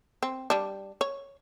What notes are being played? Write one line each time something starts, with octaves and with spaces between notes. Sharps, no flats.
C4
G3 D4
C#5